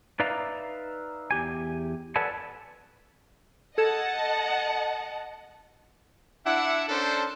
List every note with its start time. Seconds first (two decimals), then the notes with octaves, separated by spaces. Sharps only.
0.20 D#4 B4 D5 E5 F5 A#5
1.31 E2 G4 G#5
2.16 A4 B4 D5 F#5 G#5 A5
3.78 A4 D#5 F#5 A5 G#6 E7
6.45 D4 E4 E5 F#5
6.89 C#4 D4 A4 A#4 C5